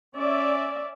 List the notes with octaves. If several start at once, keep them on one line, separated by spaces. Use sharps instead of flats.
C#4 D5 E5